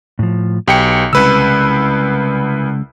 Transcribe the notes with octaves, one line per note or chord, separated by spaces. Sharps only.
A2 F3
B1 G4 B4 G5 G#5 C#7
C2 C#3 G#3 C#4 B4 E6